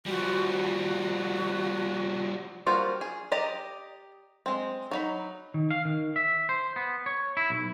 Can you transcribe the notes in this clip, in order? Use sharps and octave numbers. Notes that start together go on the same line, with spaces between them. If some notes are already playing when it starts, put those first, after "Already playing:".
F3 G3 F#4
G3 A#3 F4 F#4 C5
G#4
G4 D5 D#5 A#5
G#3 C4
F#3 D#4 B5
D#3
F5
D#3
E5
C5
B3
C#5
E4
B1